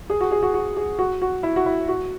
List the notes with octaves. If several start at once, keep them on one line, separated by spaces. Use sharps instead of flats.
G#4
F#4
G#4
F#4
F#4
G#4
F#4
F#4
E4
F#4
E4
F#4